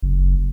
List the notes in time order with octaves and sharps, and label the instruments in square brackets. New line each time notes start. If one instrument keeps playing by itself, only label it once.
[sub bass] F#1